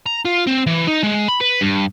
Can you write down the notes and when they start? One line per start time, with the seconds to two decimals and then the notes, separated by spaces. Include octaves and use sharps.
0.06 A#5
0.25 F4
0.47 C4
0.67 E3
0.87 D#4
1.03 G#3
1.28 B5
1.41 B4
1.61 G2